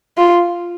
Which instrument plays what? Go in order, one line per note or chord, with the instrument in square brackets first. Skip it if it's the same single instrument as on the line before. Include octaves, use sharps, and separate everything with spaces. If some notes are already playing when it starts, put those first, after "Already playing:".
[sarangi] F4